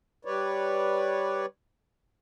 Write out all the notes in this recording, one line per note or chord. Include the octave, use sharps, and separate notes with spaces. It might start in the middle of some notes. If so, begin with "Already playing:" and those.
G3 B4 C#5 D5